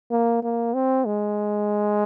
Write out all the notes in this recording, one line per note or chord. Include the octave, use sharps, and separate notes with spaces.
A#3
A#3
C4
G#3